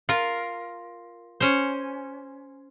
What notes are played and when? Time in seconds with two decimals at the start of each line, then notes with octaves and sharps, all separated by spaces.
0.09 F4 A#4
1.40 C#4 C5